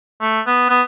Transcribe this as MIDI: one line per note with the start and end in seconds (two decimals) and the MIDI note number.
0.20 0.40 57
0.46 0.65 59
0.69 0.82 59